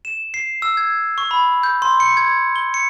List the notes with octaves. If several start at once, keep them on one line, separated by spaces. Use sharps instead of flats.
E7
C7
E6
G#6
C#6
B5
G6
C6
C#7
G#6
G7
C#7